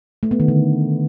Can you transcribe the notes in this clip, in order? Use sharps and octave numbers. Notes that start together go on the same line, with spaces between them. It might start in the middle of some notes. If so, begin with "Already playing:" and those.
A3
B3
D#3
D3